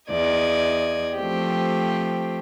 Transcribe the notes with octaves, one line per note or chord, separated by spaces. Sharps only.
E2 D5 D#5 G#6
F3 A3 C4 G4